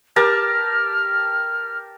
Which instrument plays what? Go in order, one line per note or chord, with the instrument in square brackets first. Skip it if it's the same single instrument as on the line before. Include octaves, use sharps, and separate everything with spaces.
[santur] G4 A#4 A5 [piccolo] F6